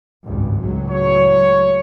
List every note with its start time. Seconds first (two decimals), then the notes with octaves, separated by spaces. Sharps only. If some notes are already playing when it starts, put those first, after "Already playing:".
0.23 G#1 C#2 G2
0.62 C#2 A2 F#3
0.91 C#5